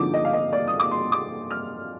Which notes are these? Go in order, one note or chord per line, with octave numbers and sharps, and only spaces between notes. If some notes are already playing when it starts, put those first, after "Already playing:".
Already playing: D3 F3 C4 D#4 D6
D#5
F5
D#5
D5
D#6
D6
C6
D6
F6